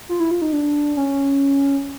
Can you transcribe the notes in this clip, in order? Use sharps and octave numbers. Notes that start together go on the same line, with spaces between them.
F4
E4
F4
D#4
D4
C#4